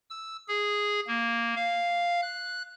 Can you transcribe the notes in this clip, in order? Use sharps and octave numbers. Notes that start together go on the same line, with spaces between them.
E6
G#4
A#3
F5
F#6